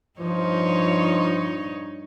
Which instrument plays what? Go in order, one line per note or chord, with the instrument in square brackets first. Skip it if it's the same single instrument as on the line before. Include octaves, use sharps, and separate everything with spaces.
[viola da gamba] G2 D#4 C#5 [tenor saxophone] F3